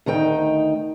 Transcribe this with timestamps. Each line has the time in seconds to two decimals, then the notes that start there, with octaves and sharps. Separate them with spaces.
0.06 D2 D#3 D#4 G5